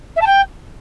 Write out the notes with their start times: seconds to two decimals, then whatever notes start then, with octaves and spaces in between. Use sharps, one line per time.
0.16 E5
0.21 A5
0.26 G5